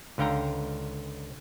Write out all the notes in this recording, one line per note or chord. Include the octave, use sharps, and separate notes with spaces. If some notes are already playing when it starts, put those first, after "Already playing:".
C#2 D3 F5 G5 A#5